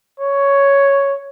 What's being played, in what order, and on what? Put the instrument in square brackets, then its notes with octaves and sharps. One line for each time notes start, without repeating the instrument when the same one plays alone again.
[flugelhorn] C#5